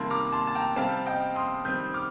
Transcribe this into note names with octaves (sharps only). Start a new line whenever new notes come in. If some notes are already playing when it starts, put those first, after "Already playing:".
Already playing: C3 D#3 G3 A#3 A5 C6
A#5 D6
A5 C6
A5
G5 A#5
C3 G3 C4 F5 A5
D#5 G5
C6 D#6
D#3 G3 C4 D#6 G6
D6 F6